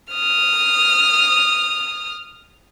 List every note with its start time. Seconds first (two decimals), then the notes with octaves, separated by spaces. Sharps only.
0.12 D#6 F6